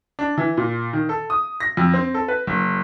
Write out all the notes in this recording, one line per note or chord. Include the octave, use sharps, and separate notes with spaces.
D4
E3
A#2
D#3
A4
D#6
A#6
F2
C4
A4
B4
F#1